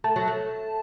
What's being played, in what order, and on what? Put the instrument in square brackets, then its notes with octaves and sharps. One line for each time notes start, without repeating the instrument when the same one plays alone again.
[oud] A3 [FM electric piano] A5
[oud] F#3
A3